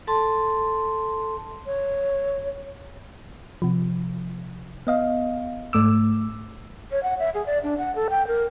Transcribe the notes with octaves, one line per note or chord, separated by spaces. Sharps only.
A4 A5 C6
C#5
C3 F3
B3 D#5 F5
G#2 A3 D6 E6
C#5
F#5
E5
G#4
D5
D4
F#5
A4
G5
A#4